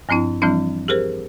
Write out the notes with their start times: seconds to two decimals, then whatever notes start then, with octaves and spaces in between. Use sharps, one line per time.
0.09 G2 F3 C4 D4 E4
0.42 E3 F3 G3 C4 D4 E4
0.88 G4 G#4 A#4 C5